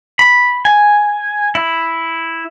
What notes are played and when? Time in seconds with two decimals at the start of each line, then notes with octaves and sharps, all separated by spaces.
0.19 B5
0.65 G#5
1.55 E4